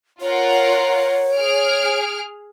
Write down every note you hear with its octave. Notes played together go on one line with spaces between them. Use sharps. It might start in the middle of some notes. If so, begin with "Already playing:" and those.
F4 A#4 C#5 F#5
G#4 F6 D7